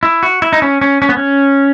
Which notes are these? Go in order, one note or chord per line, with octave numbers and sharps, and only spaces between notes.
E4
F#4
E4
D#4
C#4
C#4
C#4
B3
C#4